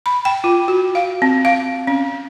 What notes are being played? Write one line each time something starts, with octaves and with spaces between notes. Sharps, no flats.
B5
G5
F4
F#4
F5
C4
F5
C#4